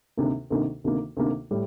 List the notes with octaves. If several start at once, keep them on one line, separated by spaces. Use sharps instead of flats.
D2 C3 D#3 A#3
D2 C3 D#3 A#3
D2 C3 D#3 A#3
D2 C3 D#3 A#3
A2 G3